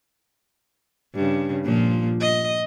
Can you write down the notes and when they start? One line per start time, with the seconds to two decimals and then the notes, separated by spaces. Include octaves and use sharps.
1.15 G2 C#3
1.64 A#2 F3
2.21 D#5